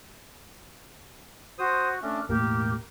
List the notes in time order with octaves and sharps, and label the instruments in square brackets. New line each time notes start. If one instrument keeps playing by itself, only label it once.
[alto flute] F#4 [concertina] C5 D#6
[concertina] A3 C#4 [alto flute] D4
[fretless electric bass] E1 A2 A#3 [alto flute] G4 [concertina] A#4